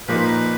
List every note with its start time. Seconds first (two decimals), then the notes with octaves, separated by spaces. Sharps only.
0.08 A#2 F3 A#3 D#4 B4